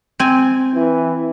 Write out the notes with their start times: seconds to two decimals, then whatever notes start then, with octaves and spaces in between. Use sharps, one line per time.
0.19 C4 G#5
0.74 E3